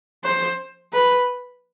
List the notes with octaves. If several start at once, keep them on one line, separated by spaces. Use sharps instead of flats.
C5
B4